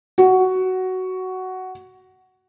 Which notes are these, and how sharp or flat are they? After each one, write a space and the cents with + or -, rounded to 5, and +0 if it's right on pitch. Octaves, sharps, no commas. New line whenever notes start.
F#4 +10